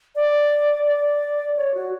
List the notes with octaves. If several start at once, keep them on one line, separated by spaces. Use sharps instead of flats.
D5
D5
C#5
F#4